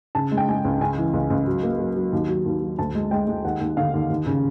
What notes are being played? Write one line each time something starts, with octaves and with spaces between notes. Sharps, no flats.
C#3 A5
G#3
G5
G#3 G#5
C#2
C#3 G#5
E3
C#2
C#2
F#3
A#3
F#3
F#3
D#2
F#3
D#2
F#3
D2 A5
G#3
G#3 G5
G#3
D#2 F#5
D#2
D3 F5
D#2
D#2
C#3